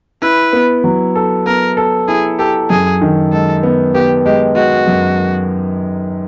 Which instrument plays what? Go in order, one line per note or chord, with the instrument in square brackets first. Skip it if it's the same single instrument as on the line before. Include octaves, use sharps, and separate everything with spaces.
[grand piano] E4 [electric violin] B4
[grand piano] B3
F#3
A4
[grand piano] B3 [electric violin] A#4
[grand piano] A4
[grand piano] E4 [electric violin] G#4
[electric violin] G4 [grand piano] A4
[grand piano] F#2 [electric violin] G#4
[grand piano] D#3
[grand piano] G#3 [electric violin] A4
[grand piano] B3
[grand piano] B3 [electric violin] G4
[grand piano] G#3 [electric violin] G4
[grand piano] G#3 [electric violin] F#4
[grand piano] F#2